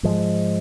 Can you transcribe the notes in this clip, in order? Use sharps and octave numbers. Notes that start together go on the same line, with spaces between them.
G#2 F3 G#3